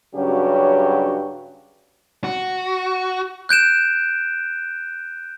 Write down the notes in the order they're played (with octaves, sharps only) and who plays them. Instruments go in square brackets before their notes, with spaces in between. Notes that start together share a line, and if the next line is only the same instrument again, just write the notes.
[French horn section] G2 C#3 F#3 C#4 F#4 G4
[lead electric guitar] F#4
[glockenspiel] F#6 G6 D7 E7